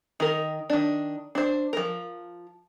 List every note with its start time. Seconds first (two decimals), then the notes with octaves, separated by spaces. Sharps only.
0.20 D#3 A#4
0.70 D#3 D4
1.35 D4 C5
1.73 F3 A#4